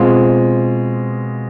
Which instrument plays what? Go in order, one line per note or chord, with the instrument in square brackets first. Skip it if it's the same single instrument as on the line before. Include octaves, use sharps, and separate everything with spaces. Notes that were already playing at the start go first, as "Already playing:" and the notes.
Already playing: [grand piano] B2 G#3 C4 F4